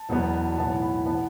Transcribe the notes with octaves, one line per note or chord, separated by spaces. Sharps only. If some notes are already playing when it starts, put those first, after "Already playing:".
Already playing: A5
E1 E2 B2 F#3 B3
B1 A2 E3 B3 A5
B5
E3 B3 A5